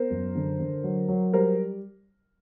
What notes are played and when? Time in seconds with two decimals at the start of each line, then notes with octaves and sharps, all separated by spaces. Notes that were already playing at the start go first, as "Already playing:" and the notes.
Already playing: B3 A#4 C5
0.10 F#2
0.35 D3
0.59 D3
0.84 F#3
1.08 F#3
1.33 G3 A#4 C5